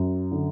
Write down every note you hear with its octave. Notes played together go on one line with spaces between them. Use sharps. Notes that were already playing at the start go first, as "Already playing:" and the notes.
Already playing: F#2
D3